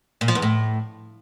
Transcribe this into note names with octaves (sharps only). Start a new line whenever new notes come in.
A#2
F3
E2
A2